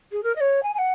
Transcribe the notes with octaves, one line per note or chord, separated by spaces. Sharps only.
G#4
A#4
D#5
C#5
G#5
G#5
F#5